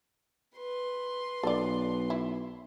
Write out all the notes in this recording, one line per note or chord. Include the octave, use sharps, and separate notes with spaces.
B4 C6
B1 A4 D5
E4